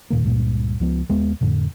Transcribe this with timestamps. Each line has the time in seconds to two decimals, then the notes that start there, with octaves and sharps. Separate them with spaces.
0.10 E2 A#2 D#3 A#3
0.25 C#2 G2 A#2
0.80 C#2 F3 B3
1.09 D#2 G#3 B3
1.41 F2 A2 D3